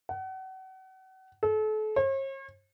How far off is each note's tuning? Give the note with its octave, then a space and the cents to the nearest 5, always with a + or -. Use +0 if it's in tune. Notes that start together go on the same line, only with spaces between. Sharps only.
F#5 +35
A4 -35
C#5 -45